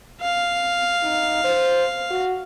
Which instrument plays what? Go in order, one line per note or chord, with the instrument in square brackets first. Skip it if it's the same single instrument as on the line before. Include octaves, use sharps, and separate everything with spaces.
[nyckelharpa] F5
[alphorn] D#4
C5
F#4